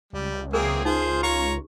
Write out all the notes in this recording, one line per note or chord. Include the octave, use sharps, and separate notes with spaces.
C#2 G3
E3 F#3 A#3 C4 G#4 A#4
D#4 F4 G#4 C5
G4 C#5 A#5 C#6